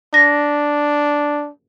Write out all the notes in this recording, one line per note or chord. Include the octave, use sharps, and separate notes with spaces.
D4 A#6